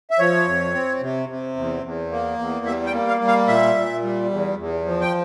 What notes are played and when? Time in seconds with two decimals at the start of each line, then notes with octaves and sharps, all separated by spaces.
0.11 E5
0.19 F3 C#5
0.46 F2
0.74 C4
1.01 C3
1.29 C3
1.56 E2
1.83 E2
2.11 A#3
2.39 E2
2.66 G3 E5
2.86 G5
2.93 A#3
3.07 F5
3.21 G3
3.28 F5
3.47 A#2 E5
3.75 A#2
4.03 G3
4.30 E2
4.58 E2
4.85 F3
5.01 G5